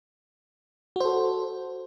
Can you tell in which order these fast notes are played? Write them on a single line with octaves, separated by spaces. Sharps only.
F#4 C5 A4